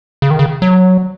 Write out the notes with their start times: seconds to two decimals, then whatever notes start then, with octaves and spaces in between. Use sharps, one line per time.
0.22 C#3
0.31 D#3
0.39 C#3
0.62 F#3